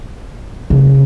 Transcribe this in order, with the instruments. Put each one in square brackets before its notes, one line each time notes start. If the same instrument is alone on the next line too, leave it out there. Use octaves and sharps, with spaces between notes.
[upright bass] C#3